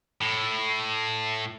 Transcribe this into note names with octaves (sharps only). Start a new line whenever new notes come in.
A2